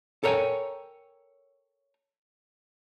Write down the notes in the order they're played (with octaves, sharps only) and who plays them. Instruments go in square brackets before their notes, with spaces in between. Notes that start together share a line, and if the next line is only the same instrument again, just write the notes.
[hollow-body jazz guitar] A4 A#4 C#5 E5 G5 G#5